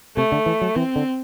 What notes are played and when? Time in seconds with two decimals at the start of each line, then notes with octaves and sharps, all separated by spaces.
0.16 C3 A3
0.32 D3
0.46 E3
0.61 F#3
0.76 E3 C4
0.96 D3